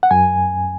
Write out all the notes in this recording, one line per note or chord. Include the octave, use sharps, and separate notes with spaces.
F#5
F#2 G#5